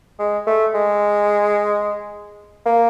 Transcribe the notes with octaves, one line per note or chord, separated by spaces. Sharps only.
G#3
A3
G#3
A#3